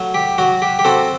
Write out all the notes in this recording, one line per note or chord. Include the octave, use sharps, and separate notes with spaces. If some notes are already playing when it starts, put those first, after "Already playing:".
Already playing: F#3 A3
G4
F#3 F#4
G4
G4
C4 F#4 A4